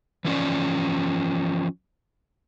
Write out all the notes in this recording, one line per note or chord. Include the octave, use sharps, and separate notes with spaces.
E3 F3 C#4 D5